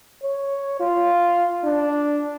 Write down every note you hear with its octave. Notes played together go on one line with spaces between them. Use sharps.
C#5
F4
D4